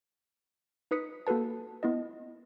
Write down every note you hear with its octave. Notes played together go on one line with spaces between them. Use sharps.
D#4 B4 D#6 B6 C#7
A#3 F#4 A4 B4 A5
B3 E4 D#5